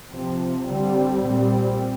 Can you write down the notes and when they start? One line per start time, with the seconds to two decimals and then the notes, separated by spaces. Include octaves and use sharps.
0.11 C3 F3 C4
0.67 D3 G3 C4
1.22 A#2 G3 C4